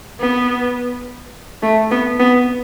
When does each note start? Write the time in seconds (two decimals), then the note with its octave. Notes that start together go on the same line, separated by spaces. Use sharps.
0.21 B3
1.62 A3
1.91 B3
2.20 B3